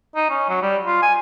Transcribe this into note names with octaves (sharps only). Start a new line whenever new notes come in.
D#4
C#4
F#3
G3
F4
G#5